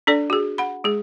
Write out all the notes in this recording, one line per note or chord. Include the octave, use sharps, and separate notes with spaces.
D4 A4 D5
F#4 G#4
F#5 B5
G#3 G#4